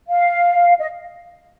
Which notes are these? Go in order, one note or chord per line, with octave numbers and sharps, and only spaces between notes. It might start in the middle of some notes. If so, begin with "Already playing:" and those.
F5
D#5